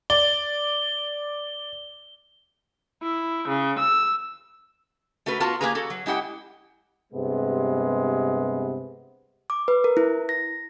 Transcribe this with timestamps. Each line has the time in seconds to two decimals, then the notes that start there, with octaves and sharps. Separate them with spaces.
0.10 D5 G7
3.01 E4
3.49 C#3
3.80 E6
5.26 A3 F#4 A#4 B4
5.40 B3 F4 F#4 A#4 F5 A5
5.61 A#3 G4 G#4 B4 A#5
5.75 F#4 A4
5.90 F#3
6.06 G#3 E4 G4 F#5 G5
7.13 G2 C3 G#3 B3
9.50 D6
9.68 B4
9.84 A#4
9.97 E4
10.29 A#6